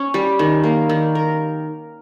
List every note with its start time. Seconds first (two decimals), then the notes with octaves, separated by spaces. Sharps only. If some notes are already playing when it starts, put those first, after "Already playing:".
Already playing: C#4
0.14 G3
0.39 D#3
0.64 A#3
0.89 D#3
1.15 A#4